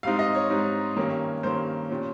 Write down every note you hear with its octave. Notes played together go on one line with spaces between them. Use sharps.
G#2 G3 C4 D#4 F5
D#5
C#5
G#2 G3 C4 D#4
G2 D#3 A#3 C#4
G2 D#3 A#3 C#4 C5
A#2 G3 C#4